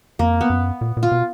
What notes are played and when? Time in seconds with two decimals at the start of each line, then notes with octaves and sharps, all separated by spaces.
0.19 F2 A#3
0.41 B3
0.50 F#2
0.81 A#2
0.97 A#2
1.03 F4
1.12 B2